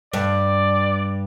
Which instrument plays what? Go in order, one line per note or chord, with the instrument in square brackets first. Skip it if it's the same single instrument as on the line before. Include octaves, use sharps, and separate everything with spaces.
[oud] G2 [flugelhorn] D5